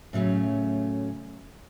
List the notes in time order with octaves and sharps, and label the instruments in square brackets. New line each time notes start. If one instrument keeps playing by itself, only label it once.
[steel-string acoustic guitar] A2 C#3 F#3 A3 C#4